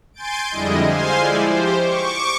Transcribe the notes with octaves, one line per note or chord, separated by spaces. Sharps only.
G#5 C6 G6 A6 D7
F2 D3 G3 G#3 E4 D#5
C5 F5 G#5 C6
F3 G#3 E4 D5
G4 C5
C#6 D6